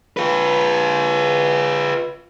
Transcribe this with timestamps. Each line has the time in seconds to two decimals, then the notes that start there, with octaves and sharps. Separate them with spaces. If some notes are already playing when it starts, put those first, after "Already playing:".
0.17 F4 B4